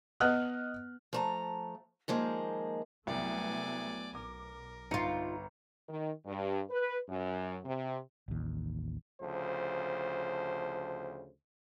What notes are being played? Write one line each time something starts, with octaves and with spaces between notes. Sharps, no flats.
B3 B4 D#5 F#5 F6 F#6
F3 A3 A#5
D#3 F3 G#3 A#3
C2 F#3 A3 B3 D5 G#5
B1 A#4 D6
G1 D#4 F4 A#5 C#7
D#3
G2
B4
F#2
C3
A1 D#2
D2 C#3 F3 C5